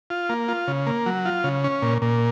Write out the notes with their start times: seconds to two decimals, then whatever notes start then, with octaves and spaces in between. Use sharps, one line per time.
0.10 F4
0.29 A#3
0.48 F4
0.67 C#3
0.87 A#3
1.06 F#3
1.25 F4
1.44 C#3
1.64 C#4
1.82 A#2
2.02 A#2